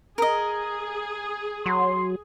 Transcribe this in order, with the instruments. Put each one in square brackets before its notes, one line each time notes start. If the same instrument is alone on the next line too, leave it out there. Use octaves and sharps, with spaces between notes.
[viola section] G#4 [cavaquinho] A#4 D#5
[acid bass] F#3 [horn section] C6